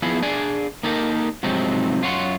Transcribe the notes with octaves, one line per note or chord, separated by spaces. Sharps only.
F3 B3 E4 G#4
D4 G#4 D5 G#5
A#3 D#4 G4 A4 A#4 A#5
G#2 C3 F3 F#3 C4 D#4
F#2 F4 C#5 F#5 C6